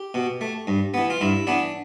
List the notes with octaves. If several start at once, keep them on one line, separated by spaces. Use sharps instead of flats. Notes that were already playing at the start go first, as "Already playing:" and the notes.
Already playing: G4
B2
A3
G2
E3 B3
F4
G2 E4
E3 B3 D4